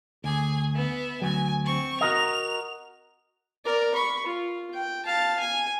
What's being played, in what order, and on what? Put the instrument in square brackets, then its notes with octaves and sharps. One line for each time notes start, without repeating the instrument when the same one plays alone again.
[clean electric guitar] D2 [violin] G#4 G#5
[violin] B3 E5
[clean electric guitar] D2 F#3 [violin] G#5
[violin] C4 C#6
[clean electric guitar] F#4 A#4 D#5 [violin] F7
[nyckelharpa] A#4 D5
B5 C#6
F4
G5
F5 A5
G#5